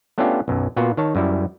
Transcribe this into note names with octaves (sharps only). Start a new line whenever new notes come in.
A3 B3 C#4 D4 F4 G4
B1 F#2
A#2 B3 F4 F#4
D#3 C#5 A5
F#2 G3 E4